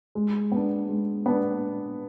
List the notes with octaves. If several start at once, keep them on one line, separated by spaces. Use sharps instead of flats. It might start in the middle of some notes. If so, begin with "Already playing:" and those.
G#3
B3 D4
G#3
B3 D4